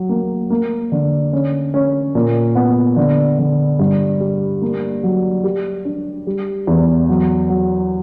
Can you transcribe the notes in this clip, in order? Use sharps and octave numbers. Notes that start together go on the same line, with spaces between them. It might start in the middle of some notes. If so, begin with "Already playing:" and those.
Already playing: F#3
A#3
A#3
D3
C#4
C#4
A#2
B3
D3
D3
G2
G3
A#3
F#3
G4
D4
G3
E2
F#3
F#3